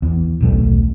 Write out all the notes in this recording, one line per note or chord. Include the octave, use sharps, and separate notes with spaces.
E2
D#1 B1 A3